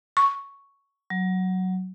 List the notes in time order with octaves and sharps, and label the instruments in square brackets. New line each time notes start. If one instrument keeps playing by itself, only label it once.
[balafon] C#6
[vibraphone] F#3